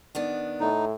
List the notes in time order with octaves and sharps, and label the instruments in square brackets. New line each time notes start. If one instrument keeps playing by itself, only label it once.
[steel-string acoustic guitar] D#3 B3 D4
[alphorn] A2 [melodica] D#4